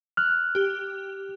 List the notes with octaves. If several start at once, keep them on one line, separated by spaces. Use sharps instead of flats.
F6 F#6
G4